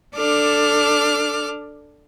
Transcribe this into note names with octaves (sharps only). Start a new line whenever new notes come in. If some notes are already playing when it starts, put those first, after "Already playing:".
D4 A4 D6 F6